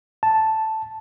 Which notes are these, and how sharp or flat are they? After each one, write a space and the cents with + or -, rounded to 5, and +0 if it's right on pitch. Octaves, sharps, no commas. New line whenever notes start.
A5 +0